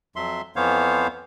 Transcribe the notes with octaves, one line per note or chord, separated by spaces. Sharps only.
F2 F#3 E5 C6
F2 E3 B3 C5 C#5 F5